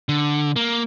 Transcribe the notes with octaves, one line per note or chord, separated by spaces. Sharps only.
D3
A#3